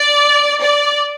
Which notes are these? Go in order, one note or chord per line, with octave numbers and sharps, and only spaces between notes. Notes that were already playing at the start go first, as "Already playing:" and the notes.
Already playing: D5
D5